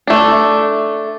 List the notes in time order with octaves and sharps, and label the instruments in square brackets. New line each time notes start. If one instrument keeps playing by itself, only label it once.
[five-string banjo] A3 D4